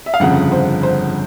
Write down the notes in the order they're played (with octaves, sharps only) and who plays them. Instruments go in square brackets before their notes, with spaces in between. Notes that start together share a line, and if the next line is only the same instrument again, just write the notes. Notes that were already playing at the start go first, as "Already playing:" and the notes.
[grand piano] E5
F5
G1 F2 C#3 F#5
C5
C5